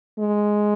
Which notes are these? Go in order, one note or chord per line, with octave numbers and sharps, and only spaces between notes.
G#3